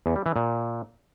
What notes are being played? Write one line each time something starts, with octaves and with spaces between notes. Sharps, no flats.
E2
G3
E3
A#2